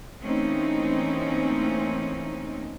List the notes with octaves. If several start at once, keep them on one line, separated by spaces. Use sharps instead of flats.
E3 A3 A#3 C4 C#4 D#4